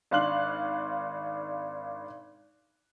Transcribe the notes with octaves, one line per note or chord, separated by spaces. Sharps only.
G#1 D4 F5 C6 F#6 F#7